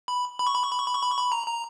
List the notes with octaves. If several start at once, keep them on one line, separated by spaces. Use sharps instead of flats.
B5
B5
C#6
B5
C#6
B5
C#6
B5
C#6
B5
C#6
B5
A#5
A#5